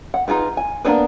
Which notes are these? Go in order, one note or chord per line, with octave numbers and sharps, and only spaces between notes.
F#5
D#4 F4 G#4 B4
G#5
A#3 B3 D4 G#4 B4